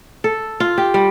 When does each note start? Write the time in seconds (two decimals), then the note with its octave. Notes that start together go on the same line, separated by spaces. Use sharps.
0.24 A4
0.60 F4
0.78 G4
0.94 G3